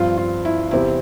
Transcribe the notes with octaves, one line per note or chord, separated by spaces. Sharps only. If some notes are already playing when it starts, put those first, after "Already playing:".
Already playing: G2 F3 C4 F4
F4
E4
E2 C3 G3 C4 E4